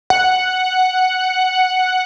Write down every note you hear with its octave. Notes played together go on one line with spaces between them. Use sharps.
F#5